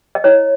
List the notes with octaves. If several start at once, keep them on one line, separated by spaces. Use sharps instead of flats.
D#5
E4 C#5